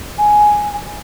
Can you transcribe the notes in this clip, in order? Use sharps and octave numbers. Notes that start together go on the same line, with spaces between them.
G#5